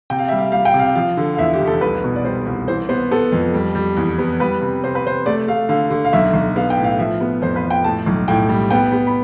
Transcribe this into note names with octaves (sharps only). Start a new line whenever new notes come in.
C3 G5
F5
G3 E5
F5
G3 F5
G5
C3
F5
F3 F5
D3
F5
E2 E5
G4
F1
A4
C2 B4
B2
D5
G3 C5
C2
E3 C5
B3 C5
B3 A4
F2
G3
G3
E2
B3
G3 B4
C3
C3 C5
B4
C3 C5
A3 D5
A3 F5
D3 F5
D3
F5
B1 E5
B1
B3 F5
G5
A2
F5
F3 E5
B3
F2 C5
B4
F3
G5
A2 A5
B1
A2 G5
G3
B3 G5
B3
B5